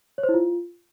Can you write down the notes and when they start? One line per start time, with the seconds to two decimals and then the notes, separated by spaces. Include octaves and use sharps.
0.18 C#5
0.23 C5
0.29 E4
0.34 F4